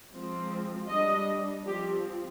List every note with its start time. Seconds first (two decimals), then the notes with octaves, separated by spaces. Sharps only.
0.13 F3 G#3 C4
0.89 G3 D4 D#5
1.66 F3 C4 G4